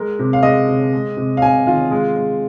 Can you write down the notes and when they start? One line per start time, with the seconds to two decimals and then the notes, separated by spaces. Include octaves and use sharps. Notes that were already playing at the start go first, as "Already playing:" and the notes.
Already playing: G#3 A#4
0.19 C3
0.33 F5
0.43 G#3 D#5
0.68 C3
0.93 G#3
1.17 C3
1.37 F5
1.42 C3 G#5
1.67 D#3 F4
1.91 G#3
2.16 G#3